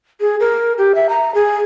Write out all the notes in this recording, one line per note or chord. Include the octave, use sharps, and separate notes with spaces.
G#4
A#4
G4
E5
A#5
G#4